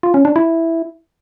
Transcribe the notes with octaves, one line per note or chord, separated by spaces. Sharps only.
F4
C#4
D4
E4